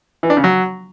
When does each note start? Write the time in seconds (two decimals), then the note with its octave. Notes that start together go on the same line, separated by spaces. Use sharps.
0.23 E3
0.30 D4
0.37 C#3
0.44 F#3